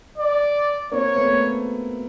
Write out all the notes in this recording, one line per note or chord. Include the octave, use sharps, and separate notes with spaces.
D5
A#3 C4 C#5
A3 B3